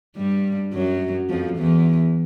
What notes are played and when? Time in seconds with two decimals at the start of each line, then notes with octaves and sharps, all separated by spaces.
0.17 G2 G3
0.73 F#2 F#3
1.30 F2 F3
1.58 E2 E3